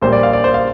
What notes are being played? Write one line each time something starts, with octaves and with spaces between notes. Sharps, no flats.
A#1 A#2 G3 A#3 C5
D5
F5
D5
C5
F5